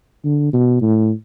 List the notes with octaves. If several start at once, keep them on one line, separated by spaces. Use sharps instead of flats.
D3
B2
A2